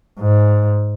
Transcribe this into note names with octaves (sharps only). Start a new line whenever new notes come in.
G#2